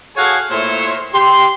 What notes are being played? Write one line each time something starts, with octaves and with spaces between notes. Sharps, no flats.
F#4 G#4 A4 C#5 F5 G#5
A#2 A3 E4 C5 C#5
G4 C6